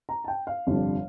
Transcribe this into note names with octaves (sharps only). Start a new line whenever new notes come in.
A#5
A5
G5
F5
G1 F2 C3 G3 D4